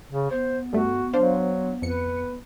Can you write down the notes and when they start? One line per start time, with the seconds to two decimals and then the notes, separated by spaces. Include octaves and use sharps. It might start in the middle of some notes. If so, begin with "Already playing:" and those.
0.11 C#3
0.31 B3 C5
0.73 G2 A3 F#4
1.13 F#3 D4 C5 F5
1.82 F2 B4 C#7